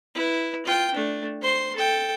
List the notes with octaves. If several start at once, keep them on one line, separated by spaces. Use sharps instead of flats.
E4 B4
F4 G5
A3 D4
C5 C6
A4 G5